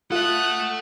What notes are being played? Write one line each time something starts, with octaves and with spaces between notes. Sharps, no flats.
F4 A4 E5 F#5 D#6 F#6